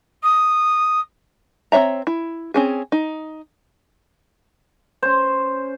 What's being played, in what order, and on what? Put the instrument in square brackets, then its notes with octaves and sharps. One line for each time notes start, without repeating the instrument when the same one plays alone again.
[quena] D#6
[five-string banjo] C4 D4 C#5 E5 A#5
E4
C4 C#4 G#4
D#4
[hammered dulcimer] C#4 C5